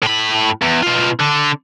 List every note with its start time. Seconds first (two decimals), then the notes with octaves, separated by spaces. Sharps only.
0.03 A2 B5
0.62 E2
0.83 B2 F4
1.20 D3